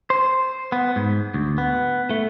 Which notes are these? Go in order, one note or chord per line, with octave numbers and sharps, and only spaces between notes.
C5
B3
G#2
D2
B3
A3